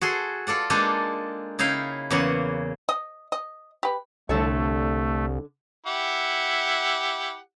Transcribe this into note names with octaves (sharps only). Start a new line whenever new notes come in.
F#4 G#4 A4 C6
F4 A4 D5 F#5
G#3 A#3 D4 D#4 A4
C#3 D#4 E4 F5 G5
E2 C#3 A#3 F#5
D#5
D#5
G4 B4
C2 D3 A3 A4 C#5
E4 G4 F#5